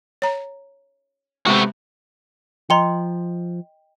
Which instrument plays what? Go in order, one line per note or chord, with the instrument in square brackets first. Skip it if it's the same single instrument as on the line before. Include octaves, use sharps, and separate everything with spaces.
[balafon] C#5 A#5
[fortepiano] C3 B3 C4 [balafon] G#3 [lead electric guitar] A3 F#4
[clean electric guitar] F3 [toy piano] D#5 G5 [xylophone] A#5 C6 C#7